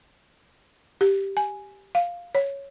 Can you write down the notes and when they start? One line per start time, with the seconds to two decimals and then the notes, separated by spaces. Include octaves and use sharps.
1.01 G4
1.37 G#5
1.95 F5
2.35 C#5